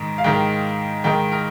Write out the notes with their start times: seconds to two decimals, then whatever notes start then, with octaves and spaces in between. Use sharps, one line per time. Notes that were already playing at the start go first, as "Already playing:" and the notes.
Already playing: G#2 D#3
0.18 F5
0.24 G#2 D#3 G5
1.04 G#2 D#3 G5
1.32 A#4